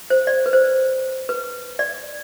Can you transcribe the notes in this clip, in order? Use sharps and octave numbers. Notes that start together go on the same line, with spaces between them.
C5
D5
B4
C5
B4
D5